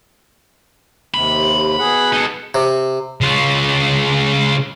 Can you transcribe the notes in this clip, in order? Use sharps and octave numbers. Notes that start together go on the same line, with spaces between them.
D#2 C3 B5
B2 G#4 F#5
D#4 A4
C3
C#3 F4